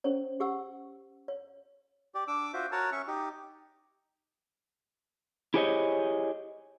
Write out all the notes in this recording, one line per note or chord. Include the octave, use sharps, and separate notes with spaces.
C#4 C5 C#5
G4 F#5 E6
C#5
G4 D5
D4 D6 E6
F4 F#4 C5 E5
F#4 A#4 C#5 F#5 A5
C#4 E5 C#6
D#4 G4
E4 G4 G#4 C5 C#5 D#5